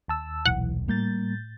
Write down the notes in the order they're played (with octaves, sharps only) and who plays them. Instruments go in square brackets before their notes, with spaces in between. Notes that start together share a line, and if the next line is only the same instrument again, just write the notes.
[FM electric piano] D#2 A5 E6
[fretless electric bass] D#1 B1 [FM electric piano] E3 [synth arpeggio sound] F#5
[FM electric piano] A2 G6 A6 [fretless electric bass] G3 A#3